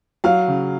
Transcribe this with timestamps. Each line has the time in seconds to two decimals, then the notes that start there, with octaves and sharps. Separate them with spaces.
0.24 F#3 F5
0.48 C#3